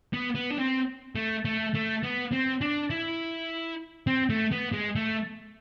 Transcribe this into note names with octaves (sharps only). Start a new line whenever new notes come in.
B3
B3
D4
C4
A3
A3
A3
B3
C4
D4
E4
C4
A3
B3
G#3
A3